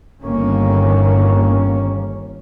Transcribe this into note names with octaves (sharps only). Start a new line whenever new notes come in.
G1 D#3 A#3 C#4